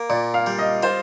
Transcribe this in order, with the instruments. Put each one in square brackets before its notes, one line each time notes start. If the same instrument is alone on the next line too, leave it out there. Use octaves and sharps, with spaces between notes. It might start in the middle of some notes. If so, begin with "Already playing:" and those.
Already playing: [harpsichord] A#3
[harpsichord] A#2 [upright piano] D5
[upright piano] F5
[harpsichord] G3
[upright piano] D#5
[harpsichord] F4 [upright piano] C5